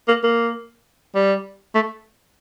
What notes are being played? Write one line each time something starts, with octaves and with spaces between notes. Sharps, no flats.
A#3
A#3
G3
A3